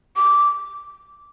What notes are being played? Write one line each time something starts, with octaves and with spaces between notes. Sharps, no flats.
D6